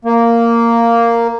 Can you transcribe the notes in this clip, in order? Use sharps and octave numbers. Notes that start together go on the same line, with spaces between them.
A#3